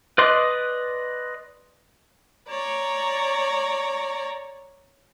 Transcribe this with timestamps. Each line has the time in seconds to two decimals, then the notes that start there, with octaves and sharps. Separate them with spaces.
0.18 B4 D5 D#5 C6 D6
2.49 C#5 D5 A#5